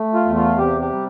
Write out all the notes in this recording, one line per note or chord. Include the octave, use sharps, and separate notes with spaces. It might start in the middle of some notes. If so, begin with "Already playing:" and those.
Already playing: A3
F4
E2
F4
C3 G4
G4
G3